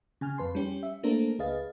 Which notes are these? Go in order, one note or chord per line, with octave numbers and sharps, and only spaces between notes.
C#3 G#5 F6
F2 B4 A5 C6
G3 C#4 G4
E5
A3 A#3 D4 A4 A#4 C5
C#2 G#4 B4 D#5 F5 A6